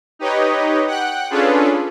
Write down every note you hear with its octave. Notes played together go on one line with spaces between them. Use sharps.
D#4 G4 B4 C#5 D#5
F#5 G5 F#6
C#4 D4 F4 G#4 A4 B4